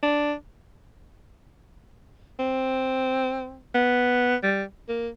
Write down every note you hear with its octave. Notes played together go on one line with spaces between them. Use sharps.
D4
C4
B3
G3
A#3